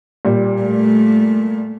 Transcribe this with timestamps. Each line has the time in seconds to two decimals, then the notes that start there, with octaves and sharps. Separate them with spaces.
0.25 A#2 G3
0.63 A3